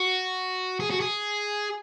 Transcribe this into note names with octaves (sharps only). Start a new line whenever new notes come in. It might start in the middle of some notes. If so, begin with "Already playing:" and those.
Already playing: F#4
G#4
F#4
G#4